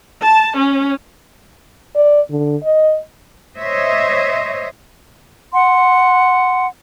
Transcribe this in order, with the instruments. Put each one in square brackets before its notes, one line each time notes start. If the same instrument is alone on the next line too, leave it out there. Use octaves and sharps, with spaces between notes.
[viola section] A5
C#4
[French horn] D5
D3
D#5
[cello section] C5 C#5 D#5 E5
[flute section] F#5 C6